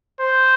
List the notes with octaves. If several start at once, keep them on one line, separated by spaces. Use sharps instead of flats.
C5